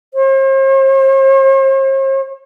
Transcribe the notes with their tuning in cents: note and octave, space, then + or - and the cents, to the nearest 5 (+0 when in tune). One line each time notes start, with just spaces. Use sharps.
C5 +45